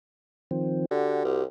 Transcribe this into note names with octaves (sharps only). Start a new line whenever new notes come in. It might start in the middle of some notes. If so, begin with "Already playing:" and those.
D#3 F3 C4
D3 F#4 G4
C2